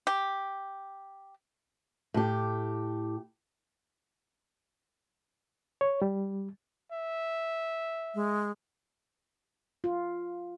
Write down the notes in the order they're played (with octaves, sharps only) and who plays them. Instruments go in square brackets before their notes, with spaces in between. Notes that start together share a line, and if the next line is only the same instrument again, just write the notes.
[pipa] G4
[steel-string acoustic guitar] A2 G4
[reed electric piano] C#5
G3
[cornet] E5
[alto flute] G#3
[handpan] F4